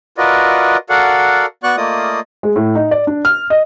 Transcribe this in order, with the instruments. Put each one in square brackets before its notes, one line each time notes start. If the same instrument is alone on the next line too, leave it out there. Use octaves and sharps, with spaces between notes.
[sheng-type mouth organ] F4 F#4 A#4 B4 D5 D#5
F#4 A4 A#4 D5 F5 F#5
B3 F#4 D5 C#6 F#6
A3 A#3 F4 D5 D#5 D#6
[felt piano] G#3
A2
D#4
D5
D4
F6
D#5